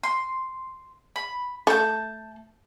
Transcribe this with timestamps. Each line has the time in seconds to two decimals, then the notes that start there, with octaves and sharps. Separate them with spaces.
0.03 C6
1.16 B5
1.67 A3 A5 G6